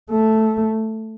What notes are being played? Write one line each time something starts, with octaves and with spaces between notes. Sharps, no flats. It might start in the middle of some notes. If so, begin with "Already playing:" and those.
A3